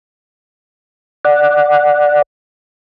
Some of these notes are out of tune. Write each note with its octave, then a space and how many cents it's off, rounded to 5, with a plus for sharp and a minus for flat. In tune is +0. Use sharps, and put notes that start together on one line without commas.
D5 +5 F#5 -5